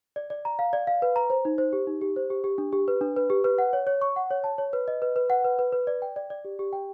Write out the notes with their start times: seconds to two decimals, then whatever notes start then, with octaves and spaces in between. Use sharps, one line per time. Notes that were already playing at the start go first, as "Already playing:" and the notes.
0.16 D5
0.30 D5
0.45 A#5
0.59 F5
0.73 D5
0.87 F5
1.02 B4
1.16 A#5
1.30 C5
1.45 D#4
1.58 C5
1.73 G4
1.87 D#4
2.01 G4
2.16 C5
2.30 G4
2.44 G4
2.58 D4
2.73 G4
2.88 B4
3.01 D4
3.16 B4
3.30 G4
3.44 B4
3.58 F#5
3.73 C#5
3.87 C#5
4.01 C#6
4.16 F#5
4.31 C#5
4.44 A5
4.58 C#5
4.73 B4
4.88 D#5
5.02 B4
5.16 B4
5.30 F#5
5.45 B4
5.59 B4
5.72 B4
5.87 D5
6.02 G5
6.16 D5
6.30 D5
6.45 G4
6.59 G4
6.73 G5